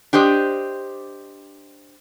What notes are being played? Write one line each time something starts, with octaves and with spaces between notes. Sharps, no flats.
D4 G4 C5 D#5